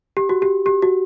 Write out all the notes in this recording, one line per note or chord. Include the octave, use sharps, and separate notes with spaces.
G4
F#4
G4
G4
F#4